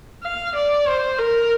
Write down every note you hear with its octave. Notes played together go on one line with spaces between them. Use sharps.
F5
D5
C5
A#4